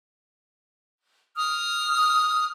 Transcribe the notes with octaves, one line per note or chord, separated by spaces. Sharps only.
D#6 F6